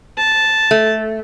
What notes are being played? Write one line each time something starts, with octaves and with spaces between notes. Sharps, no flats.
A5
A3